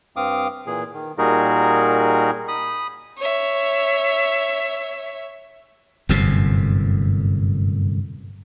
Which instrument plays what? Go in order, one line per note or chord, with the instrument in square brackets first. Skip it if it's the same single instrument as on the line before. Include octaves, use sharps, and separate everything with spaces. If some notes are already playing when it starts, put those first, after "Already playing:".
[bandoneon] G2 C4 F5 D6 D#6
A#2 E3 G#4
D#3
A#2 G3 D#4 F#4 G#4 A#4
B5 D#6
[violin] C#5 E5
[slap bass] G1 F#2 A2 C3